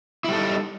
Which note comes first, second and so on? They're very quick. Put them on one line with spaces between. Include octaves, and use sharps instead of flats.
E4 G3 A4 D#4